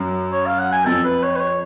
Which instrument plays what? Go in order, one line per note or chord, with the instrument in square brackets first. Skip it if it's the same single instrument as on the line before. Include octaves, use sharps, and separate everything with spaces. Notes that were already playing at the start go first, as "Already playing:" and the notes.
Already playing: [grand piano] F#2
[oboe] C#5
F5
F#5
G#5
[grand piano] F2 [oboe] A4
[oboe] B4
C#5
B4
C#5